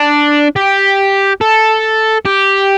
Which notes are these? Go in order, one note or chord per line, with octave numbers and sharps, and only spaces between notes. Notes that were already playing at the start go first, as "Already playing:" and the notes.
Already playing: D4
G4
A4
G4